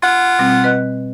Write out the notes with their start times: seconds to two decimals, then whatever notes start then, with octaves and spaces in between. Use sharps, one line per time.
0.03 F4 F#5
0.39 B2 G3 C4
0.64 B4 D#5 F#6